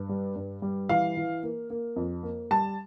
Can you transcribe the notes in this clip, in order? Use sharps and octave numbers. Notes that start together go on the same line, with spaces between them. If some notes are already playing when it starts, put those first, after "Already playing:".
Already playing: G2
G3
G2
G3
E3 F5
E3
A#3
A#3
F2
A#3
G3 A5